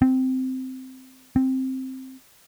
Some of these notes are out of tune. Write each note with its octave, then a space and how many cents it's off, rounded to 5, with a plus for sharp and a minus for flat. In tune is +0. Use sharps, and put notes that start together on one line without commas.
C4 -10
C4 +5